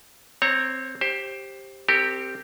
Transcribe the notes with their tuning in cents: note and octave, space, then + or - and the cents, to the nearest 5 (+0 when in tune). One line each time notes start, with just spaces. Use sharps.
C4 +0 C#5 -20 A#5 +0
G4 +0 C5 +20
C4 +0 G4 +0 A#4 -40